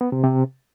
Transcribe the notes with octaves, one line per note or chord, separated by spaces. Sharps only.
B3
C3
C3